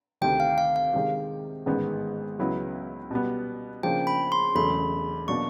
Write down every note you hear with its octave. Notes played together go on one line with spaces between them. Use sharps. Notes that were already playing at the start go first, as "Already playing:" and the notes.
D2 C3 D#3 G5
F5
F5
F5
C3 D#3 G#3
A1 G#2 D#3 G#3 B3
C#2 C#3 F#3 B3 E4
B2 G3 B3
C#3 F3 A#3 D4 G5
B5
C6
E1 E2 C#3 F#3 A3 B5
B2 F#3 A#3 D4 C#6